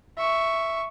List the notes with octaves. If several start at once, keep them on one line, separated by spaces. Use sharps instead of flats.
E5 C#6